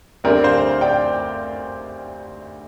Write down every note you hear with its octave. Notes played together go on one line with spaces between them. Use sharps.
D2 D3 G3 C4 A#4 D5
C5 F5
D5 G5